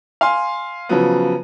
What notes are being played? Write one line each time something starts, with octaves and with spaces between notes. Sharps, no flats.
F5 G#5 C6
C#3 F3 F#3 B3